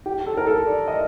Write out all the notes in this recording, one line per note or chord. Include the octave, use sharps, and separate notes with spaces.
G4
A4
A#4
A4
D5
D#5